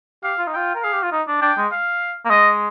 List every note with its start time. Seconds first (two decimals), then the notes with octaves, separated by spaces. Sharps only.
0.23 G4 F5
0.38 F4
0.47 D#4
0.53 F4 G5
0.75 A#4
0.82 G#4 F5
0.93 G4
1.03 F4
1.12 D#4
1.28 D4
1.41 D4 G5
1.57 G#3
1.71 F5
2.25 A#3
2.30 G#3 D#5